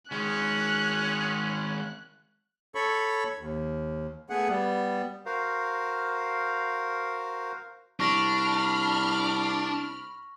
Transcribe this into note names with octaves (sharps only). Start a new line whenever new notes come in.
D#3 G#3 C#4 F#6
A4 C#5 B5 C#6
D#2
A3 B3 G#4 F#5
G3 B3
F#4 A#4 C5 F5
C2 D4 B5 C#6 F6 A#6